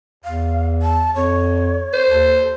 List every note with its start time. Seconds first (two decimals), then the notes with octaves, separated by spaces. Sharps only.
0.24 E2 F5
0.82 A5
1.15 F2 C#5
1.93 C5
2.09 D#2 A4